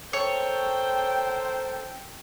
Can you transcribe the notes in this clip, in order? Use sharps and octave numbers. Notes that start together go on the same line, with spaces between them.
A4 A#4 C5 C#5 G5